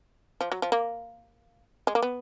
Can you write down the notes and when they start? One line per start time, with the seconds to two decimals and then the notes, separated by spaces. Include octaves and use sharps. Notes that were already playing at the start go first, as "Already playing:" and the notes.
0.41 F3
0.52 F#3
0.62 F3
0.72 A#3
1.87 G#3
1.95 A#3
2.02 B3